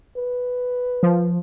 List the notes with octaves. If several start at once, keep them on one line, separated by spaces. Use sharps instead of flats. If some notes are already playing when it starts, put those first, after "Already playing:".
B4
F3